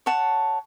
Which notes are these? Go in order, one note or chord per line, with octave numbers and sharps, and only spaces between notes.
C#5 F#5 A5